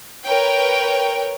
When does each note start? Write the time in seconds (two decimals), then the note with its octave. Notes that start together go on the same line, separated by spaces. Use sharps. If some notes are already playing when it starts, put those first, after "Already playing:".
0.25 A#4 B4 C#5 G5